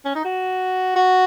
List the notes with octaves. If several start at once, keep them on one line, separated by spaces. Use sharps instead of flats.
C#4
D#4
F#4
F#4